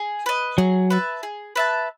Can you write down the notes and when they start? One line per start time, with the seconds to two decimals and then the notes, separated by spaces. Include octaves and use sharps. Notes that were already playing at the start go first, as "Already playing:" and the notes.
Already playing: G#4
0.26 B4 D#5
0.58 F#3 G#4
0.90 B4 E5 A5
1.23 G#4
1.56 B4 E5 A5